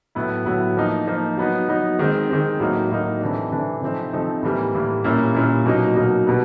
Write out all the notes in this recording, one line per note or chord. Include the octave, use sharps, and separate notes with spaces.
A2 F#3 B3 E4
A2 F#3 B3 E4
F3 A#3 D#4
F3 A#3 D#4
F#3 B3 D#4
F#3 B3 D#4
D#3 G#3 C4
D#3 G#3 C4
A2 F#3 A#3 D#4
A2 F#3 A#3 D#4
C3 E3 A3 D4
C3 E3 A3 D4
C3 F3 A3 C4 D#4
C3 F3 A3 C4 D#4
A2 E3 G3 A#3
A2 E3 G3 A#3
A#2 G3 A#3 C#4 E4
A#2 G3 A#3 C#4 E4
B2 F#3 A#3 D#4
B2 F#3 A#3 D#4
B2 G3 B3